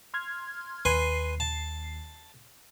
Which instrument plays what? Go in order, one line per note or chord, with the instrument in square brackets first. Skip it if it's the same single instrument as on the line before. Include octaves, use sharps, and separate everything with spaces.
[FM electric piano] C6 F6 G#6
[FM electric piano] D#2 C7 [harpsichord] B4 G#5 C6
[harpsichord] A5